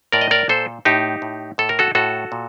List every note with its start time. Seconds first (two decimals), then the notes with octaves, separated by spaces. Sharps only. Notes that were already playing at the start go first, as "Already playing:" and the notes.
0.12 A2 A#4 D5
0.21 D#5
0.31 A#4 D5
0.49 A#2 A4 C5
0.85 A2 D#4 G4
1.22 A2
1.58 A2 A4
1.69 A#4
1.79 F#4 A4
1.95 A2 F#4 A4
2.32 A#2